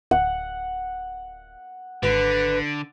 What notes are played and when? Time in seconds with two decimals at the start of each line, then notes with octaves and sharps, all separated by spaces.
0.11 D1 F#5
2.03 G#1 D3 B4